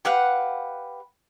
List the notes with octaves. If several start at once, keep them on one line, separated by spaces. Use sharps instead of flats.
G4 B4 F5 F#5